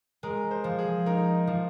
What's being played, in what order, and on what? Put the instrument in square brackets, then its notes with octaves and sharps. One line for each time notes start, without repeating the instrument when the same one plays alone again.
[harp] G#3 [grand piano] A#4
[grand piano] C5
[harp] F3
[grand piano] G#4
[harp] D#4 [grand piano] A#4
[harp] F3